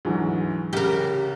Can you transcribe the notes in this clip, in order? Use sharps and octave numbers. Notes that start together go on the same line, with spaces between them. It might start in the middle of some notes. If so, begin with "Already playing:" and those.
D2 G#2 E3 F#3 G#3
C2 C#3 G4 A#4